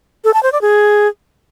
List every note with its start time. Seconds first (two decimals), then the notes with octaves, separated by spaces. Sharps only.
0.24 A4
0.34 A5
0.43 C5
0.52 D5
0.62 G#4